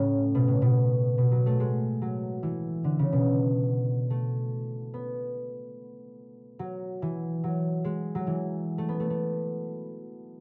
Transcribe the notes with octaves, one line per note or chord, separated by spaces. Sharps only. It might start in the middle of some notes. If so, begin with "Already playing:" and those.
Already playing: A2 C#3
B2
A2
B2
B2
F#3
A3
G#3
F#3
E3
D3
C#3
B2
A3
B3
F#3
E3
F#3
G#3
F#3
E3
A3
B3
A3
A3